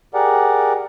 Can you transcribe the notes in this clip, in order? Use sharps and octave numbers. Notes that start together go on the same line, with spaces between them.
G4 G#4 A#4 D5 F#5